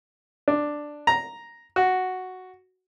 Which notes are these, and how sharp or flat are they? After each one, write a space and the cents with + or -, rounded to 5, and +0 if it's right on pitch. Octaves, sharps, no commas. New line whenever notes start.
D4 +5
A#5 +0
F#4 +0